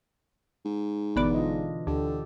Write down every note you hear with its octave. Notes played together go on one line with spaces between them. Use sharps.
G#2
G#1 B2 D3 E3 B3 D5
D4 F4 D#5
D2 D3 G4 A4